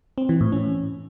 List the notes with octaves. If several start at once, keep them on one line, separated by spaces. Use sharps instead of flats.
C4
E3
A2
C#4